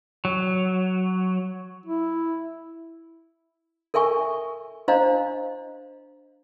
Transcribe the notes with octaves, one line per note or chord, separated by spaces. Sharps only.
F#3
E4
A4 A#4 E5 G#5 C#6
D4 C5 D#5 F5 A#5